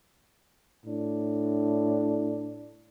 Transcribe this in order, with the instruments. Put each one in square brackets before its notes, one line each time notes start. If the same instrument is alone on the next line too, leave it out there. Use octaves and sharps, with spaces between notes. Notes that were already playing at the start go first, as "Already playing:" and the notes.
[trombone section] A2 D4